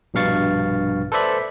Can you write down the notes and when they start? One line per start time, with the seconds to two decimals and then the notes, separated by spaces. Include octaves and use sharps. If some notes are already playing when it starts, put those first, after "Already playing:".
0.14 A#1 G2 B2 F5 C#6 A6
1.12 A4 B4 C5 D5 E5 B5